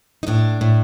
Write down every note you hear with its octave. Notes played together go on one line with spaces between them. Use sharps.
D#4
A2 D4
A2